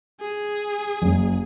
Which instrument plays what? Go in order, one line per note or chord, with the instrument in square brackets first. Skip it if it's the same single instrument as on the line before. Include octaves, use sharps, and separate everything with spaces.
[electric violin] G#4
[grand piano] F#1